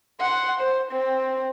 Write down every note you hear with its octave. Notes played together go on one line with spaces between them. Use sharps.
F#5 C6
C5
C4